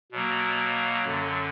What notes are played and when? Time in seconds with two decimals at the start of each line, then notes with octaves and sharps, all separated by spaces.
0.12 B2 F#3 A#3
1.05 F#2 D3 F#3